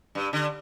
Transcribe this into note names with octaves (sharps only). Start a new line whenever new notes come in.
G2
D3